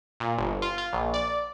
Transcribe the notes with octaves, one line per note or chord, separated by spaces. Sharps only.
A#2
G1
F4
F4
A#1
D5